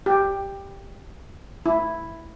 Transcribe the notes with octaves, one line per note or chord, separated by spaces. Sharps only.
G4
E4